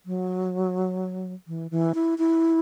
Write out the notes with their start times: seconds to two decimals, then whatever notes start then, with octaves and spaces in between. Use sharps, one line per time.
0.06 F#3
1.48 E3
1.71 E3
1.95 E4
2.18 E4